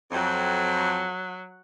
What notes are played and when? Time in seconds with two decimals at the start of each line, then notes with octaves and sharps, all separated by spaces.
0.12 F2 F#3